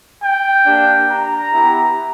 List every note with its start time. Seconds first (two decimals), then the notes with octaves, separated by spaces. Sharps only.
0.21 G5
0.65 A#3 D4 G4
1.08 A#5
1.52 B3 E4 G4